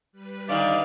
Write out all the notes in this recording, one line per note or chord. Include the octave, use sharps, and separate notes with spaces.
G3 B4
D3 D#3 D5 F5